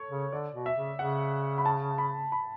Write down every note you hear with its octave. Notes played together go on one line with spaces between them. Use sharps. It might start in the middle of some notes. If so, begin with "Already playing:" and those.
Already playing: A4 C#5
C#3
D3 D5
B2
E5
C#3
C#3 F#5
B5
A5
B5
B5